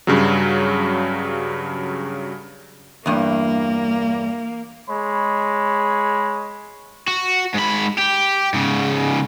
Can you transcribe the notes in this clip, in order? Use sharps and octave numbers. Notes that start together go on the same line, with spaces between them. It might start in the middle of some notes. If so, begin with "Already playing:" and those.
G2 C#3 F#3
E2 G2 A#3
G#3 C#5 B5
F#4
G#2 B5
G4
G#2 C#3